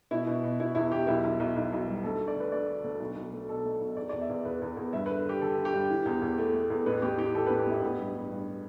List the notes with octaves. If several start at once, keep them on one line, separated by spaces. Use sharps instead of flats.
B2 E4
B2
B2
B2 E4
E2 E4
E2 G4
B1 E4
B1
B1
B1
B1
G3
D2 A4
A3
D5
D3 B4
A3 D5
D3
D2
B1
B1
A3
B2 A4
A3
B1
E2 D5
E2 D5
E5
E2
E2 B4
E2
E2
G2 E5
D3 B4
D3 G4
D3 A4
D3
G4
G2
E3
E2
E2
A3
A3
E2
A1 B4
A1 G4
E3 G4
E3 A4
A1 B4
G4
A1 E4
A1 B3
G2
G2
G2